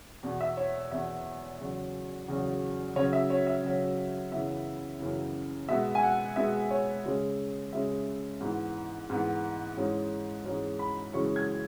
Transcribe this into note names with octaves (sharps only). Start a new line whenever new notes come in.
E2 B2 B3
E5
C#5
E2 B2 B3 E5
E2 C#3 F#3
E2 C#3 F#3
C#3 F#3 C#4 C#5
E5
C#5
E5
C#3 F#3 C#4
F#2 C#3 E3 B3 E5
F#2 C#3 E3 B3
B2 G#3 B3 E5
G#5
F#5
B2 G#3 B3 E5
C#5
C#3 G#3 C#4
C#3 G#3 C#4 E5
G#2 E3 B3
G#2 E3 B3
G#2 E3 G#3 C#4
G#2 E3 G#3 C#4
B5
F#2 C#3 E3 G#3 C#4 C#6
G#6